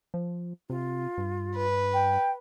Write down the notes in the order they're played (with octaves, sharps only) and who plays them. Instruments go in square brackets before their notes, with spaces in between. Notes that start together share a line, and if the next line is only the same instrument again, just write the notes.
[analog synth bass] F3
[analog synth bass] C3 [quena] F4
[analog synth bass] G2
[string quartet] B4
[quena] G5